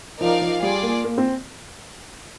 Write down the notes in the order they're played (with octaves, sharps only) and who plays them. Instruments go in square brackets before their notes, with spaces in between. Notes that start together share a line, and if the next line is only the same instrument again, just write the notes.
[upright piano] F3 [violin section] D#4 A#4 D5 F5
[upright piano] F3
[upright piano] G3 [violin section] F4 G#4 D5
[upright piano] A#3
A#3
C4